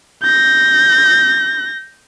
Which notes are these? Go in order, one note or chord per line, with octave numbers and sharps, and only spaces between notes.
G6 A#6